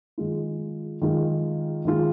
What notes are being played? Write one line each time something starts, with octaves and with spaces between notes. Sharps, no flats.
D#3 G#3 F4
D#3 G#3 F4
D#3 G#3 F4